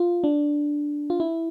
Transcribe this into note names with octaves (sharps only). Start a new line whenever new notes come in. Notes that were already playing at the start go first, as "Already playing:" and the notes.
Already playing: F4
D4
F4
E4